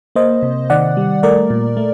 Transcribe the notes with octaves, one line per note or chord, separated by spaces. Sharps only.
A#3 C5 D#5
C3
D#3 D5 F#5
G3
A3 A#4 D5
A#2
A3